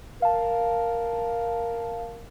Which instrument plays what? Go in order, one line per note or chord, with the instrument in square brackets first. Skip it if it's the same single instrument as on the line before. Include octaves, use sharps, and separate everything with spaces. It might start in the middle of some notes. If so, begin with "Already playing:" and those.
[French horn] A#4 [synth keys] F5 A5